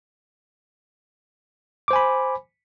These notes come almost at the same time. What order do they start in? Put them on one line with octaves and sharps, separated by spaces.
D6 C5 G#5 B5